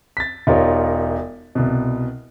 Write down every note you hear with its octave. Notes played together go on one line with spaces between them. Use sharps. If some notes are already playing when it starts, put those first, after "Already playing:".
A6 B6
E1 D#4 F4 G4 A#4 C#5
C2 B2